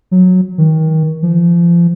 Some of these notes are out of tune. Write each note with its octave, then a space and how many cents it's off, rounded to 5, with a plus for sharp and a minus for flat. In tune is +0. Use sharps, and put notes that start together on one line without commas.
F#3 -15
D#3 +30
F3 -30